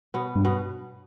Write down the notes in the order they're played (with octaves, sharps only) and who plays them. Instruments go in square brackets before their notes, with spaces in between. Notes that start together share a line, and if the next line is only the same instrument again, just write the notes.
[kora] B2 B3
[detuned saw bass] G2
[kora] B2 B3